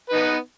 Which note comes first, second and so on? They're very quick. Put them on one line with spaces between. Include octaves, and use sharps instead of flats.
B4 D#4 B3